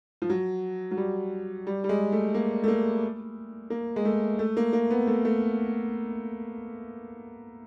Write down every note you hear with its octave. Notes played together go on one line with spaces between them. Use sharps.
F3
F#3
F#3
G3
G3
G3
G#3
A3
A#3
A3
A#3
A#3
G#3
A3
A3
A#3
A#3
B3
A3
A3